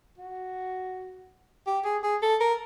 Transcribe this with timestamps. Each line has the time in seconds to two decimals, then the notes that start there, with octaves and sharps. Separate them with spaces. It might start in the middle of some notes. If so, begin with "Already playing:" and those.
0.18 F#4
1.67 G4
1.85 G#4
2.03 G#4
2.22 A4
2.40 A#4